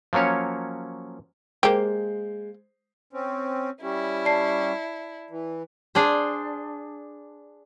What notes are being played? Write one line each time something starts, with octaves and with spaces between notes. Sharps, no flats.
F3 F#3 A#3 C#4 C#5
G#3 A#3 G4 C5
C4 C#4
G3 C#4 E4
D5 A5 C7
E3
D4 G#4 C5